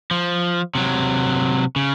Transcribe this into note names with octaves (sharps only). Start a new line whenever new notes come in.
F3
C3 F#3
C#3